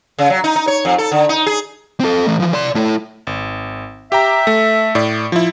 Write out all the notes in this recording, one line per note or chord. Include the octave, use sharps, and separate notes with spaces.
C#3
F#3
D#4
D#4
C#5
F2
A4
D3
D#4
G#4
C4 A4
E3 A3
E3 F3
D5 C6
A3 E4
G#1
G4 E5 G5 A#5
A3
A2 D5
F3 E4